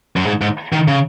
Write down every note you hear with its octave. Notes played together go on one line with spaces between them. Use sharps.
F#2
G#2
G#2
D#3
C#3